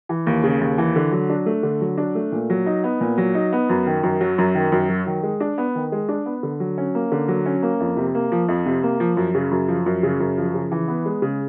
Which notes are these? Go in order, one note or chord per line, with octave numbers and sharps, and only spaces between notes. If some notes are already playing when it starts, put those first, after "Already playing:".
E3
D#2
C#3
D#2
E3
D3
F#3
D4
A3
D3
F#3
D4
A3
A#2
F#3
D#4
B3
A#2
F#3
D#4
B3
F#2
D#3
F#2
F#3
F#2
D#3
F#2
F#3
D#3
G#3
D4
B3
D#3
G#3
D4
B3
D3
F#3
C#4
A#3
D3
F#3
C#4
A#3
F2
C3
A#3
F3
F2
C3
A#3
F3
F#2
C#3
F#2
F3
F#2
C#3
F#2
F3
C#3
E3
B3
G#3
C#3